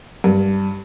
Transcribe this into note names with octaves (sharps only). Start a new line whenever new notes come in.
G2